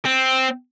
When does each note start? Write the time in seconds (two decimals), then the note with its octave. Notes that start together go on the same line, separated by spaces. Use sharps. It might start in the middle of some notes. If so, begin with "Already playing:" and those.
0.05 C4